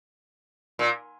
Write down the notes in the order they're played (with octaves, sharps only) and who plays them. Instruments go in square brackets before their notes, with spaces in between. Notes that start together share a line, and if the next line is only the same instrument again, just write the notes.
[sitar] A#2